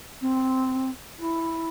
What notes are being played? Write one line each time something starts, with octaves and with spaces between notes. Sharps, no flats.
C4
E4